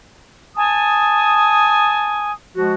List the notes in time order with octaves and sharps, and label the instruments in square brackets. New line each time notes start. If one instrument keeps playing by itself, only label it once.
[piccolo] G#5 [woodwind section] A5 D#6
[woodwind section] F3 G#3 F#4